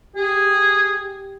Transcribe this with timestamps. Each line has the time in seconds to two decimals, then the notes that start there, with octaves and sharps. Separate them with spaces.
0.16 G4 G#4